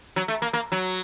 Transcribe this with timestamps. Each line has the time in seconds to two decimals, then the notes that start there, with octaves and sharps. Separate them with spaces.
0.16 F#3
0.28 A3
0.42 A#3
0.53 A#3
0.72 F#3